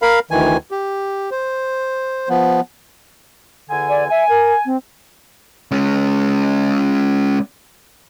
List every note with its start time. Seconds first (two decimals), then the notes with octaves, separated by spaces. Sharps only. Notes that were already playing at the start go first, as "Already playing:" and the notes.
0.02 A#4 F5 B5
0.31 D2 D#3 E3 G#5
0.71 G4
1.31 C5
2.29 F3 B3
3.70 E2 D3 G#5
3.88 D5
4.10 E5 G#5
4.29 A#4
4.65 C4
5.71 G#3 C#4